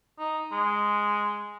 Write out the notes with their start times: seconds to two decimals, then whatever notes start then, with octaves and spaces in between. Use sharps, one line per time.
0.19 D#4
0.52 G#3